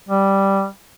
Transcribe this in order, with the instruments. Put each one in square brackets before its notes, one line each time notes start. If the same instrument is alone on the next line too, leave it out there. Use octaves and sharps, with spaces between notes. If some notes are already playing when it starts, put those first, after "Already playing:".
[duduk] G3